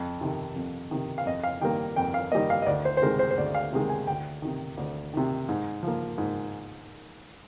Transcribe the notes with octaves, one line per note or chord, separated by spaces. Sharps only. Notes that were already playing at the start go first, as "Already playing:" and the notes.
Already playing: F2
C3 D#3
F2
C3 D#3
F5
F2 D#5
F5
D#3 G3 A#3 G5
F2 G5
F5
D#3 G3 A#3 D#5
F5
D#5
D2 D5
C5
C5
C3 D#3 G#3 A#4
C5
C5
D2 D5
F5
C3 D#3 G#3
G#5
D2 G5
C3 D#3
D2
C3 D#3
G#2
F3 A#3
G#2